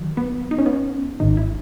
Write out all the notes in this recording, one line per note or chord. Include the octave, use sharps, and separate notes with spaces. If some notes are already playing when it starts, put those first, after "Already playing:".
Already playing: D#3 F#3
B3
D#4
C#4
B3
C#4
G#1 G#2 D#3 D#4
E4